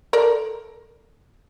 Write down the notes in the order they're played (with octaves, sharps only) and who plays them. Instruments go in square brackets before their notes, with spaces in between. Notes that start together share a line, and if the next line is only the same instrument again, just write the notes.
[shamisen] A4 A#4 D5